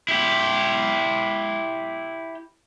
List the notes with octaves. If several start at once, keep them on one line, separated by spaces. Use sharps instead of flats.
E4 G4